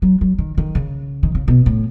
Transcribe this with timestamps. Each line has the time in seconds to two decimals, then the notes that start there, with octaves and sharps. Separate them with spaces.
0.02 F#3
0.21 F#3
0.38 D#3
0.58 D#3
0.75 C#3
1.23 D#3
1.35 C#3
1.48 B2
1.66 A2